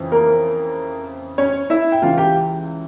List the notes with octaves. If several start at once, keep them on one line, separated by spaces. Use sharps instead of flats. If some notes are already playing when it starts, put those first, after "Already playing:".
Already playing: F2 C#3 E3
A#3 A#4
C#4 C#5
E4 E5
G5
C#2 C#3 E3 F4 F5
G4 G5